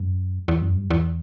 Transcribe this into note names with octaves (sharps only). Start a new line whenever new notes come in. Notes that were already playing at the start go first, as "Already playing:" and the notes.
Already playing: F#2
E2
F#2
G2
E2